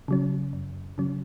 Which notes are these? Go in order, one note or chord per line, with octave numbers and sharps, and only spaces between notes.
C#3 F#3 C#4
F#2
C#3 F#3 C#4